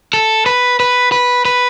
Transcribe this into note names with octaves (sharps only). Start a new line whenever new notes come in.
A4
B4
B4
B4
B4